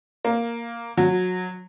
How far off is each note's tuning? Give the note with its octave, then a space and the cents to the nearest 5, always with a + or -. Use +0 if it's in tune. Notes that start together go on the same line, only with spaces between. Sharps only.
A#3 +0
F#3 -20